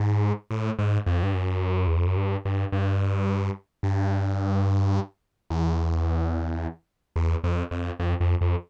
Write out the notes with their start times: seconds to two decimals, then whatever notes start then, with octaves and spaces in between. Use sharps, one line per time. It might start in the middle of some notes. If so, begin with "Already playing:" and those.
Already playing: G#2
0.51 A2
0.79 G#2
1.06 F2
1.23 G2
1.34 F#2
1.87 E2
1.97 F2
2.07 F#2
2.17 G2
2.45 G2
2.72 G2
3.83 G2
5.50 E2
7.16 E2
7.44 F2
7.71 F2
7.99 F2
8.20 F2
8.41 F2